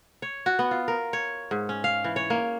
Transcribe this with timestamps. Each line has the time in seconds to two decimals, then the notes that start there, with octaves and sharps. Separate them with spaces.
0.22 C#5
0.46 F#4
0.59 B3
0.71 F4
0.88 A#4
1.13 C#5
1.51 G#2
1.69 C#4
1.84 F5
2.04 E3
2.16 C#5
2.30 A#3